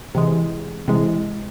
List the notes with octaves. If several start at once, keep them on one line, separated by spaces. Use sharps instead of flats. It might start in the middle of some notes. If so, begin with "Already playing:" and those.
C3 E3 G#3
C3 E3 G#3